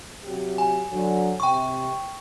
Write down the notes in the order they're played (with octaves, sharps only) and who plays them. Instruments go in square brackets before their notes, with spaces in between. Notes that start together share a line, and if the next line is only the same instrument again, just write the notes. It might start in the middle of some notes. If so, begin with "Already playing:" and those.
[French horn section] C3 F#3 G4
[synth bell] G#5
[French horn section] D3 F#3
[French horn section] C3 [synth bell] G5 C#6